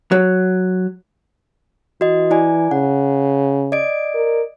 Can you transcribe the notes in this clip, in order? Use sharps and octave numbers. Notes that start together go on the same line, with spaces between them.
F#3
E3 F#4 D#5
E4 D5 G#5
C#3 F#5
D5 D#5 D7
A#4